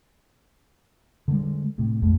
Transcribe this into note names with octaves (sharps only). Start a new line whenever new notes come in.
D3 G3 G#3
A2 C3
A#1 F2 G#3 A3